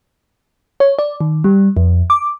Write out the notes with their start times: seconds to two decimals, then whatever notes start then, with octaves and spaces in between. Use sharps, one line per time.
0.80 C#5
0.99 D5
1.21 D#3
1.44 G3
1.77 F2
2.10 D6